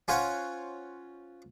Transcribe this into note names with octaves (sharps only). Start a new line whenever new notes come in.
C#4 F4 C5 C#5 F#5